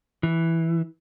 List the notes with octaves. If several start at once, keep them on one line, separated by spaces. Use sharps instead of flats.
E3